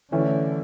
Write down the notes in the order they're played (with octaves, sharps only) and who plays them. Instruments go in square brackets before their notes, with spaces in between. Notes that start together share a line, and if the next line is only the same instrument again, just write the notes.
[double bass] D3 [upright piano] E3 A3 C#4